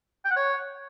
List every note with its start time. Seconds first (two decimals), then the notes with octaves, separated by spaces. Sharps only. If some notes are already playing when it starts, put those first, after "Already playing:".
0.25 G5
0.31 F#5
0.36 C#5